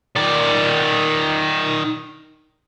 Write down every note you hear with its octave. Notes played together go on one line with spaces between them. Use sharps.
D#3 D5